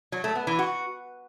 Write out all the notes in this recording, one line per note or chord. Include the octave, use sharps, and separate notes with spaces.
F#3
A3
B3
E3
F#4